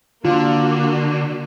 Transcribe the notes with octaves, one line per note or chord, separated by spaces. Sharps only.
D3 A#3 F4 F#4